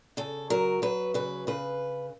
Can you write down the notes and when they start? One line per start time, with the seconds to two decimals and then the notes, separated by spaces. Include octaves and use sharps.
0.17 C#3 A4
0.50 F#3 A#4
0.82 F#3 B4
1.14 C#3 B4
1.47 C#3 B4